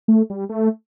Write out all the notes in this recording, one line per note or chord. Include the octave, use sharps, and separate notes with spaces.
A3
G3
A3